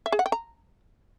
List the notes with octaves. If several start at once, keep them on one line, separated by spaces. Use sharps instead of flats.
E5
G#4
F#5
G5
A#5